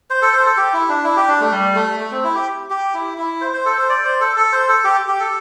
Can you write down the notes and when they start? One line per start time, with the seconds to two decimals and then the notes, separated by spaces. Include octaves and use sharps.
0.10 C5
0.22 A4
0.33 C5
0.46 A4
0.57 G4
0.73 E4
0.89 D4
1.04 E4
1.16 G4
1.28 D4
1.41 A3
1.52 G3
1.75 A3
2.00 A3
2.12 C4
2.24 E4
2.35 G4
2.70 G4
2.94 E4
3.18 E4
3.41 C5
3.53 C5
3.65 A4
3.78 C5
3.89 D5
4.05 C5
4.21 A4
4.36 A4
4.52 C5
4.69 A4
4.84 G4
5.08 G4
5.20 A4